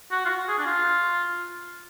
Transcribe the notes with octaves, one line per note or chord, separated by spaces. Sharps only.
F#4
F4
F#4
G#4
D4
F4